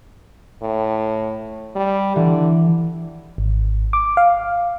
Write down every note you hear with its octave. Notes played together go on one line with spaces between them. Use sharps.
A2
G3
D3 E3
G#1
D6
F5